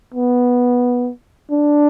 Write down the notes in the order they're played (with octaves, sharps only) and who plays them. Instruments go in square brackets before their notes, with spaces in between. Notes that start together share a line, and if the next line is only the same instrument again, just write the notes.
[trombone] B3
D4